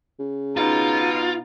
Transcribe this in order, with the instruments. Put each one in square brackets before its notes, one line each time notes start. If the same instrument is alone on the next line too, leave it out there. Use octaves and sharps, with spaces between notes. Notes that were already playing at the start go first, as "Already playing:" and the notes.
[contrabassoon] C#3
[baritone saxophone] B2 [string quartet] D#4 [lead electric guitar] F4